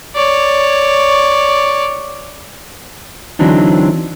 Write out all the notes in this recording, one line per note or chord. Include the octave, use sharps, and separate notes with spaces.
C#5 D5
D3 E3 F#3 C4 D4 D#4